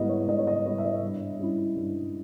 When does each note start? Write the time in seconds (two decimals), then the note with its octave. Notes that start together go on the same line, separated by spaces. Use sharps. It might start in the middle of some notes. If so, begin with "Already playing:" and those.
Already playing: G#2 G3 B3 E4 D#5
0.09 C#5
0.28 G#2 D#5
0.39 C#5
0.47 D#5
0.65 G3 B3 E4 C#5
0.78 E5
0.84 D#5
1.03 G2
1.39 G3 C#4 E4
1.76 G2